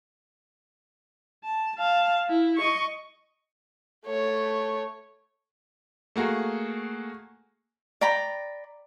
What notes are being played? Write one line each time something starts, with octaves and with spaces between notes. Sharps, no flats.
A5
F5 A5
E4
D#5 C#6
A3 C#5
A3 A#3 F#4 G#4
D5 G5 A#5 B5